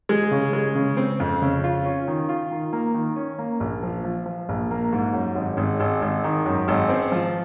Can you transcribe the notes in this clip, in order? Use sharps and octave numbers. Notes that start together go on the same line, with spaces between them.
G#3
C#3
G#3
C#3
C4
F2
C#3
F4
C#4
D#3
F4
D#3
A#3
D#3
C#4
A#3
A#1
F3
F3
F3
A#1
A#3
G#2
F#2
G#1
G#1
G#1
G#1
D#3
F#2
G#1
C4
F3